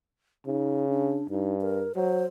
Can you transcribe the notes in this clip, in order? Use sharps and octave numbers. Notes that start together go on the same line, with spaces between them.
C#3 D#4
D4
G2 D#4
A#4
F#3 C5